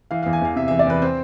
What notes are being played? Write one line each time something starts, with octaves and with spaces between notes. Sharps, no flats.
E3 F5
E2 F5
G#5
E2 F5
C3 E5
E3 E5
D5
E2 B4
C4 C5